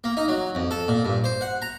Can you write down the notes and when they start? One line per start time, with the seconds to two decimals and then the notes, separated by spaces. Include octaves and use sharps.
0.04 A#3
0.17 D#4
0.28 F#3
0.55 F2
0.71 A4
0.88 A#2
1.05 G2
1.24 C5
1.41 F#5
1.62 A#5